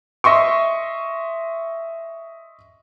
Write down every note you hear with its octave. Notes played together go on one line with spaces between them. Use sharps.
D#5 E5 C6 C#6